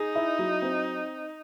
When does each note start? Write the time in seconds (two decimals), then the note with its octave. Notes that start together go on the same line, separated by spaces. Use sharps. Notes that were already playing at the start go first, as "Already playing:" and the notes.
Already playing: D#4 G#4
0.15 E4
0.39 F#3
0.62 C4